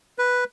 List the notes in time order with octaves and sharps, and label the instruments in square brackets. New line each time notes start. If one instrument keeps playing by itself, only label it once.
[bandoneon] B4